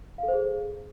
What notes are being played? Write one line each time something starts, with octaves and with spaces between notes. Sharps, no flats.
F5
A4
C5
G#4